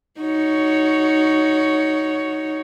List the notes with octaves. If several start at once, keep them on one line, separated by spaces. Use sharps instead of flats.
D#4 F#4 C#5